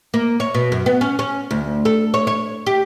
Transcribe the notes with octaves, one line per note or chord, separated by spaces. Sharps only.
A#3
C#5
B2
F#2
B3
C#4
C#4
D2
A4
C#5
C#5
G4